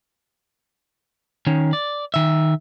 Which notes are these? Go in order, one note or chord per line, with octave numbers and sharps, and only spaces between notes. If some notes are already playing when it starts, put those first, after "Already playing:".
D#3 C#4
D5
D#3 E5